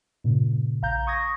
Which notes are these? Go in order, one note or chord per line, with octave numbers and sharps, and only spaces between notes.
G2 A#2 C#3
A#1 F5 A#5 G6
C#6 D#6 G#6 A#6